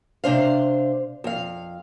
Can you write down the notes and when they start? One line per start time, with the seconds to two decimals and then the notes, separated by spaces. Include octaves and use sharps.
0.24 C3 D4 C5 F5
1.24 F2 F5